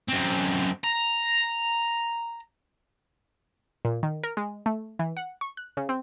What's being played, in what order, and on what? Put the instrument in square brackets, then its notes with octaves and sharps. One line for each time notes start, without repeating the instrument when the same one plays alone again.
[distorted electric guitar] F#2 C4
A#5
[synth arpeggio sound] A#2
D#3
A#4
G#3
A3
E3
F#5
C#6
F#6
C#3
C4